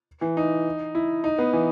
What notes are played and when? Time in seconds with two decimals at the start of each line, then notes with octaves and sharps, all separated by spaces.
0.21 E3
0.37 D#4
0.95 E4
1.24 D#4
1.38 B3
1.53 E3